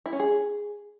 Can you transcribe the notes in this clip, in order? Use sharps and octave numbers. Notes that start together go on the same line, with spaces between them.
E4
C#4
G#4